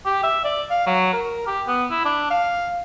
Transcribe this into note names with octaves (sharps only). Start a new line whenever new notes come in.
G4
E5
D5
F5
F#3
A#4
G4
B3
E4
D4
F5